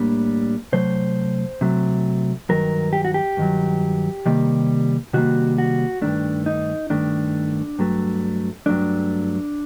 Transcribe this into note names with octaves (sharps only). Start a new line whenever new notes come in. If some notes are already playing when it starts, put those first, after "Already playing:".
Already playing: A2 G3 A#3 D4
C3 F#3 A3 C5
C3 F#3 A3
G2 D#3 F#3 A#4
G4
F#4
G4
G2 D#3 F#3
C3 D#3 G3 A#3
C3 D#3 G3 A#3 F#4
F#4
G2 D#3 A3 D4
D#4
G2 D#3 A3 D4
G2 F#3 A3
G2 F#3 A3 D4